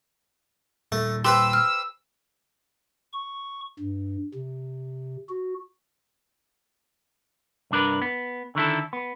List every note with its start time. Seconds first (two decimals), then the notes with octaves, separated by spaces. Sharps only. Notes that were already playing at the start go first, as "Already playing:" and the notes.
0.92 A#2 G3 A3
1.25 G4 B4 C5 C6 E6
1.53 F6
3.13 C#6
3.79 G2
4.34 C3
5.29 F#4
7.71 C2 G2 D4 A#4 B4
8.02 B3
8.55 D3 D#3 E4 A4
8.93 B3